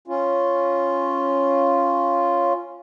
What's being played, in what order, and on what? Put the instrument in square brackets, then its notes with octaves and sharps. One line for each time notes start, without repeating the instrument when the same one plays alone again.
[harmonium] C#4 F4